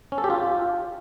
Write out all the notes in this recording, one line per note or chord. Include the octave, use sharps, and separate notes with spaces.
C#4
A4
G4
F4